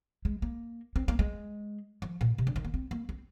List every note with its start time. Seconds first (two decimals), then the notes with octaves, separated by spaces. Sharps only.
0.25 G#3
0.42 A#3
0.96 C4
1.08 A#3
1.19 G#3
2.02 F3
2.21 A#2
2.38 C3
2.47 D3
2.56 D#3
2.65 A#3
2.74 C4
2.91 A#3
3.09 C4